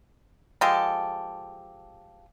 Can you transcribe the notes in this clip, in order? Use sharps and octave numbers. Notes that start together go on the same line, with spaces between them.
F3 G#3 G4 A4